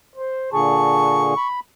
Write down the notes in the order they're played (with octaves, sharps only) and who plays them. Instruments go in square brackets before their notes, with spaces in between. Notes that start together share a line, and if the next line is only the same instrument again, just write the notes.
[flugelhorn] C5
[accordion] A#2 D3 G#4 [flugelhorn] A5 [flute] C#6
[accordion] B5